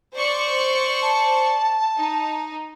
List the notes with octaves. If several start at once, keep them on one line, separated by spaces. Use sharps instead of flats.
C5 D5 C#6
A5
D#4